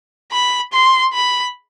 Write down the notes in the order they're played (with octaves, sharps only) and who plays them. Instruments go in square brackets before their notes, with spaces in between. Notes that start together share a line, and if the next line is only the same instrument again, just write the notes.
[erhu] B5
C6
B5